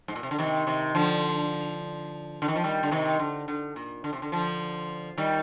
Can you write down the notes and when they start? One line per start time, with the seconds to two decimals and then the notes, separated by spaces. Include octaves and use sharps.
0.08 G#2
0.16 A#2
0.23 C3
0.31 D3
0.39 C3 D#3
0.67 C3 D#3
0.95 D3 F3
2.42 D3
2.48 D#3
2.56 F3
2.64 D#3 G3
2.83 D3
2.91 C3 D#3
3.20 D3
3.48 D3
3.76 A#2
4.04 D3
4.13 C3
4.22 D3
4.32 D3 F3
5.18 D#3 G3